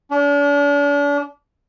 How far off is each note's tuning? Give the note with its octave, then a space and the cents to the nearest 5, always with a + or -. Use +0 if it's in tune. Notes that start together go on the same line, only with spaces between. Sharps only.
D4 -40